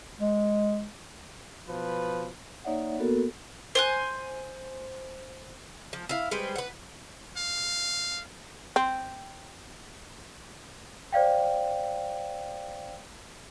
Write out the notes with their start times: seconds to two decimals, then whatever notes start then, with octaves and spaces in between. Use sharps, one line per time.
0.19 G#3
1.68 B2 F3 B4
2.64 A#3 D#4 C#5 D5 E5 F#5
2.98 A#3 B3 F#4 A4 A#4
3.75 C5 G#5 F#6
5.93 F3
6.09 E4 F5
6.31 G3 G#3 B4 C5
6.56 B4 F#5
7.37 F5
8.76 C4
11.12 C5 D5 F5 G5